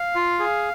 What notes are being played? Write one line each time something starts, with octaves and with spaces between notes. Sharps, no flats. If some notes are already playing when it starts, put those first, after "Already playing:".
Already playing: F5
F4
G#4